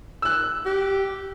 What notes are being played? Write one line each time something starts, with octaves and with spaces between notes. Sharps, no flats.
E6 F#6
G4